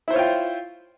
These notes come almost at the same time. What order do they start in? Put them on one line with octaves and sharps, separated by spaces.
E4 C5 C#5 F4 G5